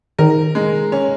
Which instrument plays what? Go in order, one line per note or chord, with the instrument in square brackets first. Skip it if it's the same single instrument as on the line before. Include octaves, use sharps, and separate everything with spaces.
[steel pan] D#3 [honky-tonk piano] A#4
[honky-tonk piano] G#3
C#4